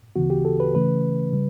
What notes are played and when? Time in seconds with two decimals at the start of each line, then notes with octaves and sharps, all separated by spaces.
0.15 D2 C#3 E3 B3 F#4
0.30 G4
0.45 A4
0.60 B4
0.75 C#3 E3 A3 C#4 B4
1.33 C#3 G3